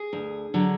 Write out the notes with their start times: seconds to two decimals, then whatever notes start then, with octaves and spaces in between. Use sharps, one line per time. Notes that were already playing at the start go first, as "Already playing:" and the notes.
Already playing: G#4
0.13 D2
0.54 D3 F#3